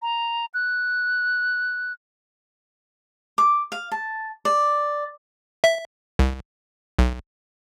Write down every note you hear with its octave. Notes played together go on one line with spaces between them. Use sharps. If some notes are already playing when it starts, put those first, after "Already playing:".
A#5
F#6
D6
F5
A5
D5
E5
C2
B1